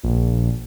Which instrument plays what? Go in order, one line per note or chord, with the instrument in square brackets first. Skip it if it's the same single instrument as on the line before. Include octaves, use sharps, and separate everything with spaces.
[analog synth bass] A#1